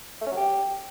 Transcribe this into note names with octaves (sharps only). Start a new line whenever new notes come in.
A3
C#4
F#3
G4